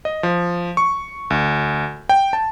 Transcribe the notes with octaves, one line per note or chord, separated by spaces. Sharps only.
D#5
F3
C#6
D2
G5
A5